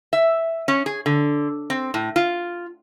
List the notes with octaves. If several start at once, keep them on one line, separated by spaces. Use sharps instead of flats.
E5
C#4
G#4
D3
C4
A2
F4